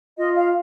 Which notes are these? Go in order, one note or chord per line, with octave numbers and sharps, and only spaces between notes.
F4 D#5
F5